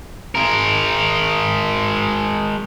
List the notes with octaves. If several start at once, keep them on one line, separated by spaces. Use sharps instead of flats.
G#3 A#4